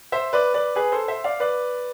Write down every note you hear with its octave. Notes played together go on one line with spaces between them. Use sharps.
C5 E5
B4 D5
B4 D5
G#4 B4
A4 C5
C5 E5
D5 F5
B4 D5